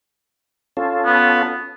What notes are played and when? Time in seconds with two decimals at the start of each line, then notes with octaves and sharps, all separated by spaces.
0.77 C#4 F4 A4
1.05 B3